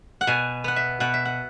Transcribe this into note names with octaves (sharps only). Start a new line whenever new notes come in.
F#5
B2 G#5
B3 F#5
E5
B2 F#5
E5
F#5